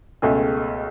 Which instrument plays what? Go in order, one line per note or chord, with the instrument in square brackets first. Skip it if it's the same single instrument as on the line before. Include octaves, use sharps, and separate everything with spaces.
[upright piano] C#2 B2 A3 C#4 G#4